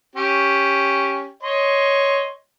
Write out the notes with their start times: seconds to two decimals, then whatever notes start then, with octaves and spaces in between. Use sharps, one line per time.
0.15 C#4 G4
1.43 C#5 D#5 C6